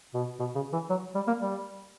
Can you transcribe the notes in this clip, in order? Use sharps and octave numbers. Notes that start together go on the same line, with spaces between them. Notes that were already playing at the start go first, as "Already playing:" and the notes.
B2
B2
C#3
E3
F#3
G3
A#3
G3